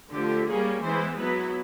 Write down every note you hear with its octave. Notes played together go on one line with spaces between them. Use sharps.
D3 F3 A3 G4
G3 A#3 C#4 G#4
E3 G#3 B3 E4 C5
F#3 B3 E4 B4